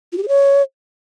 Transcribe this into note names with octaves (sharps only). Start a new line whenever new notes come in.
F4
G4
G#4
C#5